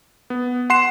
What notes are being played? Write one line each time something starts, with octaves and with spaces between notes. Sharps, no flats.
B3
F#5 C6 C7 E7